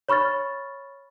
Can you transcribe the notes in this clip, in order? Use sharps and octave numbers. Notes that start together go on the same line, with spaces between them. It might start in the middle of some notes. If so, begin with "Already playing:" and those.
C#5 B5 C#6 F6 A6